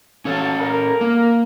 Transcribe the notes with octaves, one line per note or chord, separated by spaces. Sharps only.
F#3 C#4 A4 C#5 F5 A5
A#4
A#3